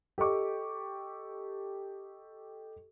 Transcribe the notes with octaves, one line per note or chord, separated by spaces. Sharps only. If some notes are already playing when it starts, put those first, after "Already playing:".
G4 A4 D#5 C#6 D6